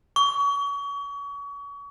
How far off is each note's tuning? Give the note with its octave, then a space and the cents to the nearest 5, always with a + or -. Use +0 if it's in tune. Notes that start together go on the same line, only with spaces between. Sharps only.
C#6 +35